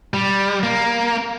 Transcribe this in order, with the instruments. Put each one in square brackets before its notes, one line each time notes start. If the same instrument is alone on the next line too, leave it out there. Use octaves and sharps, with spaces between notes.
[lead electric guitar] G3
A#3